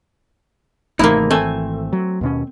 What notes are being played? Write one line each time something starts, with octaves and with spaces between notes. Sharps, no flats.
G#1 C3 E3 A3 A#3 D#4 E4
A3 C4 G#5
F#3
D#2 B2 C#4